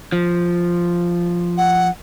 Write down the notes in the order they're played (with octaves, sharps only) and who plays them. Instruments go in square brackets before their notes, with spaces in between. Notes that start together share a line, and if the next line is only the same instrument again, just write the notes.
[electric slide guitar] F3
[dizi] F#5